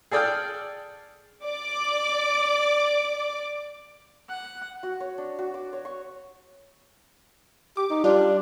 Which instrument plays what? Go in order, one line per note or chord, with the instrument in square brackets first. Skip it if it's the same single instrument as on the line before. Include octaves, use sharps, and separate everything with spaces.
[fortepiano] G#4 A4 D5 G5 D#6 F6
[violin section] D5 D6
[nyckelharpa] F#5
[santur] F#4
C#5
D4
F#4
D6
C#5
C#6
[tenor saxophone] G4 [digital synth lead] D6
[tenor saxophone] D#4
[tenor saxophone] G3 [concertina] D4 [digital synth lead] F4